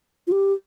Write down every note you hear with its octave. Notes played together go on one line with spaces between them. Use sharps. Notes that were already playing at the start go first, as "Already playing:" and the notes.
F4
G4